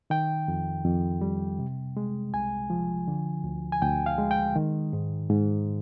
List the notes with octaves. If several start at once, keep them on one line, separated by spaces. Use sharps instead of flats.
D#3 G5
F2
F2
G3
C3
G#3
C2 G#5
F3
D3
D2
G#5
D2 G5
F5
G#3
G5
D#3
G#2
G#2